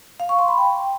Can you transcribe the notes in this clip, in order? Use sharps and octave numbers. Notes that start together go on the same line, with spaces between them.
F5
C#6
C6
B5
G5